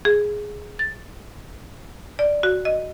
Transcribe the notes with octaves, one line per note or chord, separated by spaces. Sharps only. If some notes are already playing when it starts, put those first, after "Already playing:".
G#4
A6
D5
F#4
D#5